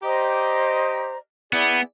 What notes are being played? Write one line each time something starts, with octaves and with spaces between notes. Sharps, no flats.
G4 C5 D5 D#5 A#5
B3 E4 G#4 D5